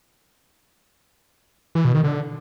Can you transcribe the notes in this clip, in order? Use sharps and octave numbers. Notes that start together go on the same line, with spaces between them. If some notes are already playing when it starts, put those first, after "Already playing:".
E3
B2
D#3
D3